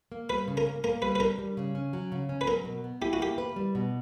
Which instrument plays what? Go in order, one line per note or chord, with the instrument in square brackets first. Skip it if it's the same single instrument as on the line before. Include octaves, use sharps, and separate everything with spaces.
[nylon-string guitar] A#3
[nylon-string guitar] G3 [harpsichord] B4
[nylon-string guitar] C#3
[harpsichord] A#4
[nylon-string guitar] A#3
[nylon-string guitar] A#3 [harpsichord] A#4
[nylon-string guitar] G3 [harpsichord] B4
[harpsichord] B4
[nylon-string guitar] D4 [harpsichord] A#4
[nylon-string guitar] G3
C#3
C#4
F#3
C#3
C#4
[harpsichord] B4
[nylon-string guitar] F#3 [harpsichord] A#4
[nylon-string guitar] B2
B3
[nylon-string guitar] E4 [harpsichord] G4
[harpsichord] F#4
[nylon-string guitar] A#3 [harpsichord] G4
[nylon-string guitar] B4
G3
B2